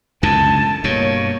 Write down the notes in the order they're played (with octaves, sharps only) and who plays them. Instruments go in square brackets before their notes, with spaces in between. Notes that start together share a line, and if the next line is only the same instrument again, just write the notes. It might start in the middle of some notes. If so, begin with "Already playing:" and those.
[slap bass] C#2 F#2 D3 [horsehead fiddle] A5
[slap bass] G2 B2 [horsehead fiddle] A#3 C#5